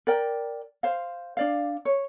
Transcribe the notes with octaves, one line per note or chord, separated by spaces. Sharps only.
A#4 D5 G5
C5 F5
D4 D5 F5
C#5